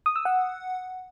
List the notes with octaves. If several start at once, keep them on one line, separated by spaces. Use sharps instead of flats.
D#6
E6
F#5